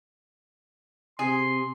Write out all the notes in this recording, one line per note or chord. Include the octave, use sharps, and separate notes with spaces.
C3 G#4 C6